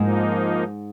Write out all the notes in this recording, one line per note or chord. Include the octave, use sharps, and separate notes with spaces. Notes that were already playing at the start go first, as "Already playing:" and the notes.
Already playing: G#2 F3 A#3 D#4